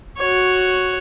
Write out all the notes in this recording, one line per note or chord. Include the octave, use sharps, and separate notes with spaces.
F#4 C#5